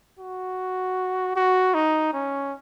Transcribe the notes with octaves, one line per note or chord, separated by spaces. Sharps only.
F#4
F#4
D#4
C#4